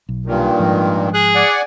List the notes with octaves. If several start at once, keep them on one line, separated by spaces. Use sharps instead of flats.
B1
G2 A#2 D#3
G#2 F3
G#4 F#6
D5 F#5 G#5